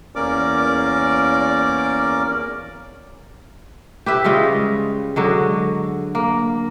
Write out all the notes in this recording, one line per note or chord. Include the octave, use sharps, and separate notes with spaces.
E2 A#3 C#4 A#4 D5 D6
G4 B4 E5
C#3 G3 G#3 F4
D3 F#3 G#3
A#3